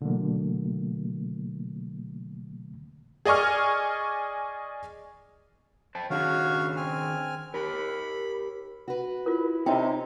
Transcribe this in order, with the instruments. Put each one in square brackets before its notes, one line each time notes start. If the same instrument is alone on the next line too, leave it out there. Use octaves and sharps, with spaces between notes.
[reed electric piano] B2 D3 E3 F#3 A3 A#3
[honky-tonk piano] G#4 D5 D#5 G#5 C#6 F6
[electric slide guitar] C5 G5 A5
[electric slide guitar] D#3 D4 G#4 [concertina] F#4 C#5 F5
[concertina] C4 G#5 F6
[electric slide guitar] G4 A#4 [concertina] B5
[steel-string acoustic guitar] F#4 B4
[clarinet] E4 [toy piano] F4 A#4
[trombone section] C3 [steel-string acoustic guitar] C#4 D#4 [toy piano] G5